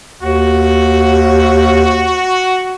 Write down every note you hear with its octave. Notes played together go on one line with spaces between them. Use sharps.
D#2 F#4